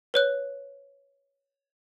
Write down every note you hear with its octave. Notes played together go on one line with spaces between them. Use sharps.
B4 C#5 F#6